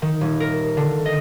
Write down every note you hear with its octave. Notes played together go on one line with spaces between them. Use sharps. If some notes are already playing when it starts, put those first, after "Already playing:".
D#3
D#1
A#4
D3
D#5